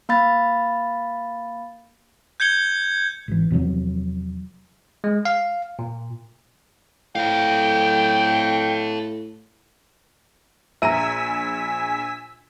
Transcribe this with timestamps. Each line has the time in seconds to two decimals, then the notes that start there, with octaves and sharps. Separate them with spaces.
0.09 A#3 F5 B5 A6
2.40 G6 G#6 C#7 G7
3.28 G#1 E3
3.50 E2 C3 F3 F#3
5.04 G#3
5.25 F5
5.79 A#2
7.16 A2 A4 F5 G5
10.82 A#1 E5 G#5 A#5 E6 B6 D#7